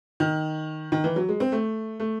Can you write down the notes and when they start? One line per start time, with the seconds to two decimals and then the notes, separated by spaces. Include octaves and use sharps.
0.20 D#3
0.92 D#3
1.04 E3
1.16 F#3
1.29 G#3
1.40 C4
1.52 A3
2.00 A3